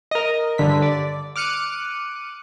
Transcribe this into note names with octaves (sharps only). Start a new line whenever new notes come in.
A#4 D#5
G2 D3 B6
D5
D6 F6 F#6 C#7 D#7